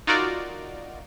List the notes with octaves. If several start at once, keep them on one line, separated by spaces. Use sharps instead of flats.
D#4 F4 F#4 A#4 D5